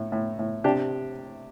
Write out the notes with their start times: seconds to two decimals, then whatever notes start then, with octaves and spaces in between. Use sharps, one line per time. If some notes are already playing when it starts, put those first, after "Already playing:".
Already playing: A2
0.12 A2
0.39 A2
0.64 C3 D4 G4